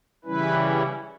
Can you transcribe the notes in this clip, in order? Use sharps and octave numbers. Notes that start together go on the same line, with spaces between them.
C#3 E3 G3 C#4 E4 B4